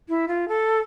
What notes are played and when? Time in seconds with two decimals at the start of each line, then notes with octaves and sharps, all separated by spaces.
0.09 E4
0.28 F4
0.48 A4